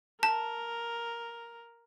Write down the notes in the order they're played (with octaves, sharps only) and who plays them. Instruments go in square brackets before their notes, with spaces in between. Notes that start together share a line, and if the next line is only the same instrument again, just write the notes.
[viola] A#4 [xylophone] A5